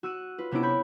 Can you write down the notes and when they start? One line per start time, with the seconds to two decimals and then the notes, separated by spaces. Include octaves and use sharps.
0.03 F#4 E6 F#6 D#7
0.38 F4 B4
0.51 C3 B3 C#4 D4 E4 D7
0.63 B5 C#6 G6